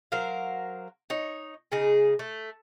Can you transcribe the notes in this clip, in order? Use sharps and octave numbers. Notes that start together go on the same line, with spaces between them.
F#3 A#4 C5 F5
D#4 C#5
C#3 D#4 G#4
A3